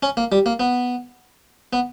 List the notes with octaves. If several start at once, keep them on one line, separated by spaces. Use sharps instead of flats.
C#4
A#3
G3
A#3
B3
B3